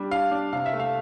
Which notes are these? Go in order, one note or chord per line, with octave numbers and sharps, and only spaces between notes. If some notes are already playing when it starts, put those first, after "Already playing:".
Already playing: G3 D4
D4 F5
D4
C3 F5
E5
A3
F5